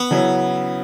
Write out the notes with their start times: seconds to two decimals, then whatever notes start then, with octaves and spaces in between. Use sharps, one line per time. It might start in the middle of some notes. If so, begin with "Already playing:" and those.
Already playing: B3
0.11 C#3 F#3 C#4 E4